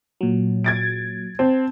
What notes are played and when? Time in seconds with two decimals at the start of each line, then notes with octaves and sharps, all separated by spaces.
0.21 A#2 F#3
0.64 G#6 A6 D7
1.39 C4 A5